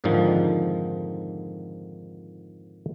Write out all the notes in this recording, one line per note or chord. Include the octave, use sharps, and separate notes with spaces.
F2 G#2 D3 D#3 F3